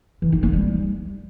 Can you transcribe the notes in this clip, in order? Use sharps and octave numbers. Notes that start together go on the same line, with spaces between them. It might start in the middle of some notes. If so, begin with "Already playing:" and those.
E3
D#4
A#3
G3